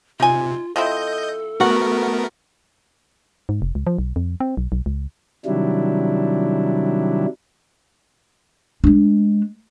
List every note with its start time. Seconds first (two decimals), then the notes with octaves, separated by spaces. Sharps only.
0.20 C3 D#4 F4 G#5
0.76 F3 C4 E4 A4 D#5 G6
1.60 A3 B3 F#4 A#4 F#5
3.49 G#2
3.62 F1
3.75 C#2
3.87 F3
3.98 B1
4.16 F2
4.40 C4
4.57 B1
4.72 B1
4.86 C#2
5.46 C3 D#3 F#3 G3 D4 E4
8.84 G#3 D4